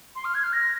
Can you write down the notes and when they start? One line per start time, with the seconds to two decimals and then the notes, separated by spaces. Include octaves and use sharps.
0.16 C6
0.25 F6
0.35 G#6
0.44 F6
0.53 A#6